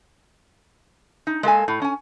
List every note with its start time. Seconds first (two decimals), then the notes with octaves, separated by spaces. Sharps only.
1.27 D#4
1.43 G#3 A#3 A4 G#5
1.68 A2
1.82 C#4 G#5